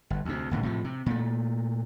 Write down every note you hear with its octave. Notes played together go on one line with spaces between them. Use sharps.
G1
D2 C3
D#1 A2 D3
A2 C3 F3
C3
A#2 A3